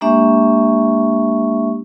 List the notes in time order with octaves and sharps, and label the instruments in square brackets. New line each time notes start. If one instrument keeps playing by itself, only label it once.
[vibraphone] G#3 A#3 D4 G4 E5 C#6